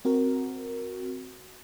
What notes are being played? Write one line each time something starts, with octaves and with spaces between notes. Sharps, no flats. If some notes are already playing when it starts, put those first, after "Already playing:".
C4 F#4 A#4